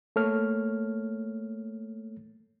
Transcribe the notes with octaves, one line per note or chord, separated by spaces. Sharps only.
A3 A#3 A4 C#5 F6